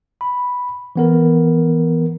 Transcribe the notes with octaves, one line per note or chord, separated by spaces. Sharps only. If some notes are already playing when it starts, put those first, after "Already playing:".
B5
E3 B3 A#4